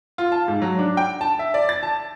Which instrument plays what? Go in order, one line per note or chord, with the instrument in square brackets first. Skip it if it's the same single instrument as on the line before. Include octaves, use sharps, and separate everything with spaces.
[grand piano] F4
A5
G#2
F#3
D4
G5
A5
E5
D5
A6
A5